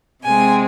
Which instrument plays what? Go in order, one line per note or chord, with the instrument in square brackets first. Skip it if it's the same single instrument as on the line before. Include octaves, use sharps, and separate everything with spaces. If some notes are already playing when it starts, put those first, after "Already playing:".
[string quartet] C3 G#3 C4 G#5